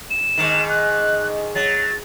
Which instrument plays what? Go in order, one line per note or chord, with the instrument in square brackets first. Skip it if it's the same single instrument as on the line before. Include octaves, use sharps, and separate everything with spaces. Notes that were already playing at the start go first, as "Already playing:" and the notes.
[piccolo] E7
[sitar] G#2 D#3
[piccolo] F#6
[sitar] F#3 [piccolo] A6